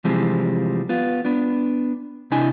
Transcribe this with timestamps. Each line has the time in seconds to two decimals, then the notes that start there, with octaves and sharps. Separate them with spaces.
0.05 C3 E3 F3 G3 G#3 C4
0.89 B3 F4
1.25 B3 D4
2.31 C3 D4 E4 D#5 G#5